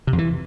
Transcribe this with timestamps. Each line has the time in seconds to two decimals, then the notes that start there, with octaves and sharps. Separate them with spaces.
0.07 C3
0.13 F2
0.18 E3